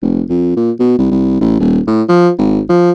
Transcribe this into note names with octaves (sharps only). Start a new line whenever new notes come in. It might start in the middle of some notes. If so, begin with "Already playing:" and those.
F1
F2
A#2
B2
C2
C2
A1
D#1
A2
F3
G#1
F3